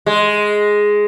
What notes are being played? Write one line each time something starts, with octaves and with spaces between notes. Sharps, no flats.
G#3